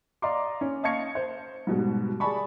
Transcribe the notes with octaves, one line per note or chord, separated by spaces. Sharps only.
D5 D#5 F5 A#5 C6 D6
C#4
D#5 F5 A5 C#6 G#6 C#7
C5
G#2 B2 G3
G#4 D5 G#5 A5 B5 C#6